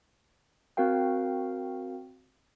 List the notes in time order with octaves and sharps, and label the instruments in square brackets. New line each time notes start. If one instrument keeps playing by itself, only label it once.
[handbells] C4 F#4 A#4 F5 G5